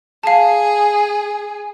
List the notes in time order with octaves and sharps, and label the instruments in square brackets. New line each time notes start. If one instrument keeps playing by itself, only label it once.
[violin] G#4 [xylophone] F5 A5